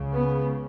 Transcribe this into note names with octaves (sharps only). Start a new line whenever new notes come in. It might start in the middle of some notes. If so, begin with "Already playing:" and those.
Already playing: C#2 C#3
B3